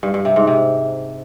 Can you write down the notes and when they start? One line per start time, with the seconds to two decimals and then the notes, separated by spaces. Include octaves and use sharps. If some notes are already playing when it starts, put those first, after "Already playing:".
0.03 G2
0.14 G2
0.25 C3
0.36 G#2
0.47 C3